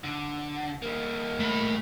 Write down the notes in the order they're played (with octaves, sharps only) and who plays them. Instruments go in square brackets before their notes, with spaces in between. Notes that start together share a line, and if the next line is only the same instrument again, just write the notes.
[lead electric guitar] D3
G3 A#3
[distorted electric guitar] A3 B5